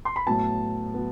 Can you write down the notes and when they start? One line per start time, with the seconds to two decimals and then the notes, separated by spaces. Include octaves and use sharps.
0.05 C6
0.16 B5
0.26 A2 F#3 B3 A5
0.94 F#3 B3